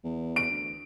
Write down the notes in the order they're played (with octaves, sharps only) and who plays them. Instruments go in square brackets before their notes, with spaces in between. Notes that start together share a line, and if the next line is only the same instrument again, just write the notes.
[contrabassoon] E2
[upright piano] D7
[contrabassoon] D2